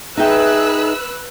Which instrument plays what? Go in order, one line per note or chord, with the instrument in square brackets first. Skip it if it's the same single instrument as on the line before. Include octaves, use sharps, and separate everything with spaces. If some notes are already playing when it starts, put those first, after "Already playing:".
[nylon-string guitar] D#4 E5 G5 [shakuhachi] G#4 [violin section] B4 E6 F#6